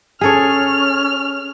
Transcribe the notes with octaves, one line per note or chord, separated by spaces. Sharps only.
C#4 G#4 A4 C#5 F6